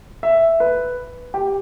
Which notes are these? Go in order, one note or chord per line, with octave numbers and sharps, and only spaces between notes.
E5
B4
G4